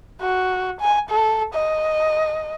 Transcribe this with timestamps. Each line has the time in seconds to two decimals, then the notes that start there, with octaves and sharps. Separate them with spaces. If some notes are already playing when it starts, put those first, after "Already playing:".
0.21 F#4
0.81 G#5
1.10 A4
1.54 D#5